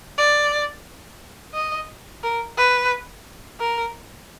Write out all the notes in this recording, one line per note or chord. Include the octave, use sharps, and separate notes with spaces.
D5
D#5
A#4
B4
A#4